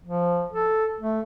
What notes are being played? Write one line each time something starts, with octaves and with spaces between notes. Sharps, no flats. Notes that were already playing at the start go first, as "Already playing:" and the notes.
F3
A4
A3